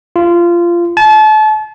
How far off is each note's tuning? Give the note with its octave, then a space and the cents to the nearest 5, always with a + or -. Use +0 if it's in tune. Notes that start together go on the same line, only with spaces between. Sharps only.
F4 -20
A5 -35